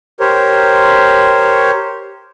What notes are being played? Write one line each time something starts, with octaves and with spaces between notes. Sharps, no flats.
G4 A#4 C5 C#5